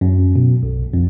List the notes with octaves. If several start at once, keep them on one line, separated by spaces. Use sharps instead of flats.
F#2
B2
B1
F2